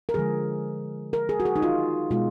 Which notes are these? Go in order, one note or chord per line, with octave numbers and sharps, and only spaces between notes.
A#4
D3 F3 G#3 G#4
A#4
G#4
F#4
G#4
D#4
F4
B2 G#3 F4